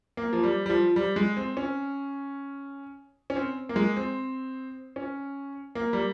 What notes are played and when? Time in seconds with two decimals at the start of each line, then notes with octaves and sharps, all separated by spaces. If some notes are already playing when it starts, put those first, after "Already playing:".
0.17 A#3
0.33 F3
0.43 G3
0.66 G3
0.70 F3
0.96 G3
1.16 G#3
1.37 C4
1.57 C#4
3.30 C#4
3.36 C4
3.69 A#3
3.76 G#3
3.96 C4
4.96 C#4
5.75 A#3
5.93 G3